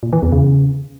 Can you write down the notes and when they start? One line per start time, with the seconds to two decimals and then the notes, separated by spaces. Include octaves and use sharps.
0.03 A#2
0.13 E3
0.22 E2
0.32 C#3